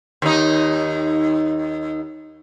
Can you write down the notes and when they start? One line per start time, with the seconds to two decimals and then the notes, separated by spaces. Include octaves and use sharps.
0.22 D#2 D#4